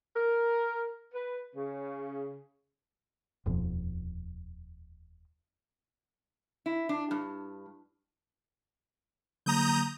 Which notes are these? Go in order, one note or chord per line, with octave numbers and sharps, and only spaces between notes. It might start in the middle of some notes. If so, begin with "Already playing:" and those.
A#4
B4
C#3
D#1 F2 B2 F3
E4
D4
G2
D3 F#3 A#3 A#5 D#6 G6